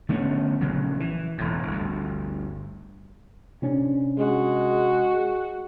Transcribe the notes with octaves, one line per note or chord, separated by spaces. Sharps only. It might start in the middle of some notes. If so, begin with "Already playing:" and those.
D3 A3 B3 C#4
A#1 C#3 F#3
E3
E1 A2
G1 D2
C3 C#4 D4
G#3 F#4